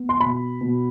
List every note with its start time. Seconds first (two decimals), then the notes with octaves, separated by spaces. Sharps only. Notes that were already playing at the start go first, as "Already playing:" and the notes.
Already playing: B3
0.09 C6
0.20 B2 B5
0.61 B2